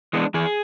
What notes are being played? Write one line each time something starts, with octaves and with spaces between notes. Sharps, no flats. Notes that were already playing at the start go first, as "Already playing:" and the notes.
E3 G#3 B3 D4
E3 G#4